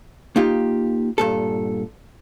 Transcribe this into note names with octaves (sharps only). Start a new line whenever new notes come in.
A#3 D#4 F4 G4
G2 A#2 A4